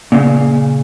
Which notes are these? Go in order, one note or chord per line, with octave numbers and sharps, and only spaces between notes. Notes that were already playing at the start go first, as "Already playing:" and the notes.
A#2 C#3